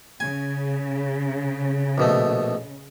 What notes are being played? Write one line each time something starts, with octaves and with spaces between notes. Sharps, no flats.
C#3 G#5
A#1 B2 A3